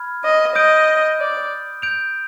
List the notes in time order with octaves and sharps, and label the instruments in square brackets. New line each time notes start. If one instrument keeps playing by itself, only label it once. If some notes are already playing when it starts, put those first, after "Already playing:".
Already playing: [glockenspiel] B5 F6 G#6
[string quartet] D#5
[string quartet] D#5 [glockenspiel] D#6 G6 D7
[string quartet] D5
[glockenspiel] G6 D7 F7